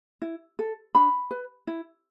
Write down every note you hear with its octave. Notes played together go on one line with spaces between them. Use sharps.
E4
A4
D4 B5
B4
E4